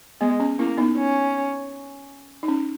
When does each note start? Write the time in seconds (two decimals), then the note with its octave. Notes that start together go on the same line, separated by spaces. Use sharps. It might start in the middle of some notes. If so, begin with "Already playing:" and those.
0.21 G#3 B3
0.40 C#4
0.59 A#3 C#4 E4
0.77 B3 D#4
0.97 C#4
2.43 D#4
2.48 C#4